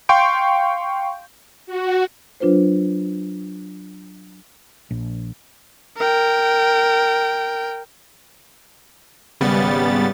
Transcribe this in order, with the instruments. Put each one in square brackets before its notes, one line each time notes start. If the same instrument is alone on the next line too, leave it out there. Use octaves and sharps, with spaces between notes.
[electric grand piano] F5 G5 C6 C#6 G6 D7
[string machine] F#4
[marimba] F#3 D4 F4 B4 C5
[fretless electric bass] A#1
[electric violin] A#4 G5
[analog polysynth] G#1 C#3 G3 B3 A6